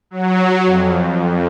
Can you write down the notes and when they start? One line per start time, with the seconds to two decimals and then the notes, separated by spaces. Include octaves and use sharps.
0.11 F#3
0.65 F2